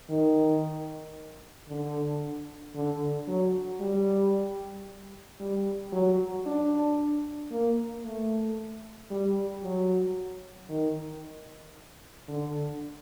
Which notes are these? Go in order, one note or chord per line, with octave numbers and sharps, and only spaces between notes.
D#3
D3
D3
F#3
G3
G3
F#3
D4
A#3
A3
G3
F#3
D#3
D3